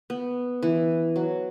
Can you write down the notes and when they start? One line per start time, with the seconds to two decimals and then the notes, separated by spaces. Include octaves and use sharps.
0.10 B3
0.63 E3
1.16 F#3